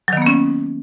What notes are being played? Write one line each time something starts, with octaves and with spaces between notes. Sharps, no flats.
D#3 F#3 A#3 B3 C#4